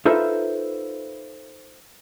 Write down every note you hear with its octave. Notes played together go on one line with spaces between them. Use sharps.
D#4 F4 A4 B4 C5 E5